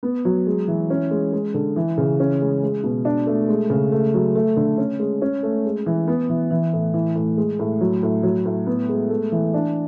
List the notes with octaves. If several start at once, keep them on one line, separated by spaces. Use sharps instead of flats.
B3
F#3
G#3
E3
C#4
G#3
G#3
D3
E3
C#3
C#4
G#3
G#3
B2
D4
A3
G#3
C#3
A3
F#3
A3
D3
C#4
G#3
C#4
A3
G#3
E3
B3
E3
E3
A2
E3
A2
G#3
A2
F#3
A2
F#3
A2
B3
G#3
A3
E3
D4